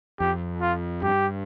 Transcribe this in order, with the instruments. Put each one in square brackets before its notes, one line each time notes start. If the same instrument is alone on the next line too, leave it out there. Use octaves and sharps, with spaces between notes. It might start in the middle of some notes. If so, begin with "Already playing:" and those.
[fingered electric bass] F2 [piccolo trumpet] G4
[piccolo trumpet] F4
[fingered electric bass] G2 [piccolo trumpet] G4